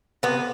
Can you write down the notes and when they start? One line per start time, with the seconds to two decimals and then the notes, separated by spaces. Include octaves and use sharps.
0.23 C3 B3